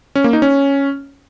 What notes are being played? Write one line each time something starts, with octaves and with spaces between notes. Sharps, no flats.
C#4
A#3
D#4
C#4